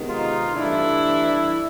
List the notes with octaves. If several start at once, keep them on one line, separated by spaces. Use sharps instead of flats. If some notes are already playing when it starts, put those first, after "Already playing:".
Already playing: C3 D#3 G#3 B3
D#4 F4
G2 E3 A3 D4 E4